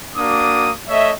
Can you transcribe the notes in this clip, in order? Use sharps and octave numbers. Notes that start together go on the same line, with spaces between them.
A#3 D4 F#4 D6 D#6
A3 C#5 D#5 E5